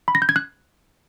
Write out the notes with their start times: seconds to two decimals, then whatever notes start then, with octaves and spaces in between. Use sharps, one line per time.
0.08 B5
0.15 A#6
0.22 G6
0.29 G#6
0.36 F#6